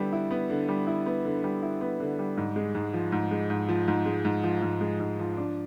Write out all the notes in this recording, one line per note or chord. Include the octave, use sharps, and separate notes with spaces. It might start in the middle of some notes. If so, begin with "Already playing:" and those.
Already playing: D3 G3 B3 E4
E4
B3
D3
G3
E4
B3
D3
G3
E4
B3
D3
G3
G#2
G#3
G#2
F3
G#2
G#3
G#2
F3
G#2
G#3
G#2
F3
G#2
G#3
G#2
F3
D4